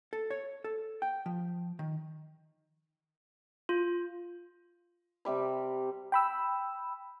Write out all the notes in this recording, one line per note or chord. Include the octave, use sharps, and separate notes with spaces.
A4
C#5
A4
G5
F3
D#3
F4
C3 G3 B5
G5 B5 E6